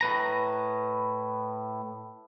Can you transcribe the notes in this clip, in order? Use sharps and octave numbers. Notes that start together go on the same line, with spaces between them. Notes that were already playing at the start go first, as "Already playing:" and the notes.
A2 B4 A#5